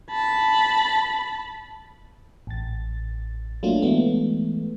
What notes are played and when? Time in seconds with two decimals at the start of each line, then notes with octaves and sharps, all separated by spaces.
0.11 A5 B5
2.47 A1 A6
3.63 F#3 A3 A#3 D4 F4
3.82 E3 G#3 A3 B3